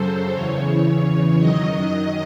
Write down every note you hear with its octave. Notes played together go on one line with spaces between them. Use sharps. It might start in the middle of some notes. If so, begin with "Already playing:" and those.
Already playing: F#2 C#3 F#3 A4 C5
E2 C#3 E3 C#5
F#2 D#3 F#3 D#5